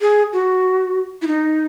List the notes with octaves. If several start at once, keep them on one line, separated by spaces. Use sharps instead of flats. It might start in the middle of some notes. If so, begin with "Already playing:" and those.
G#4
F#4
E4
D#4